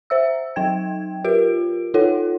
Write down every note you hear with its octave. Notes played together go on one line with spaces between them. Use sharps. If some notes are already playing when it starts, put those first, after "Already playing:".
C5 E5 E6
F#3 D#4 G5 G#6
F4 G4 A#4 D7
D#4 F4 A4 C#5 F#5